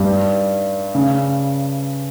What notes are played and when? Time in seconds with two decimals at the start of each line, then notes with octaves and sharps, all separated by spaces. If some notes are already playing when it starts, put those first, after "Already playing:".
Already playing: G2 G3
0.95 C#3